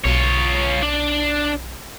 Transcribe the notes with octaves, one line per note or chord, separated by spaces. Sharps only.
B1 F4 C#5
D4